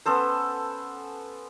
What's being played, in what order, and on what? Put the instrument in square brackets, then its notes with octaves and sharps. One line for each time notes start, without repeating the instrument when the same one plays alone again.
[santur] B3 C#4 A4 C5